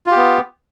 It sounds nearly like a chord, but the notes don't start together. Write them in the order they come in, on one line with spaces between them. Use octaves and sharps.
F4 G4 B3